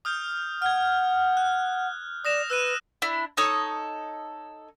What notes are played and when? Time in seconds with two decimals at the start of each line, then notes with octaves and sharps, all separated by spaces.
0.05 D#6 F6 G6
0.62 F#5 F6 G#6
1.37 F#6
2.25 D5 D#6 A#6 E7
2.50 B4 E6 F#6 D#7
3.02 D4 E4
3.37 D#4 A4 C#5 D#6